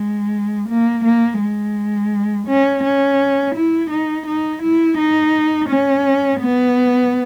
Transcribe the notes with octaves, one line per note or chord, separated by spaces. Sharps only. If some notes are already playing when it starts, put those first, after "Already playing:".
Already playing: G#3
A#3
A#3
G#3
C#4
C#4
E4
D#4
D#4
E4
D#4
C#4
B3